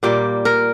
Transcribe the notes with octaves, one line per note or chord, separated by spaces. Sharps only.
A#2 G3 A#3 G4
A#4